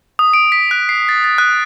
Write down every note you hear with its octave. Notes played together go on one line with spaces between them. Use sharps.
D#6
D7
B6
F#6
C7
A6
A6
F#6